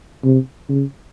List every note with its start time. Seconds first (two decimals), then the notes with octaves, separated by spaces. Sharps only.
0.24 C3
0.69 C#3